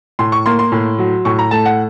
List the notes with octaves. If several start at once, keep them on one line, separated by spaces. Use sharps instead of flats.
A2 C6
C#6
A#3 C6
C6
A2
F#3
A2 C#6
A#5
A3 A5
F#5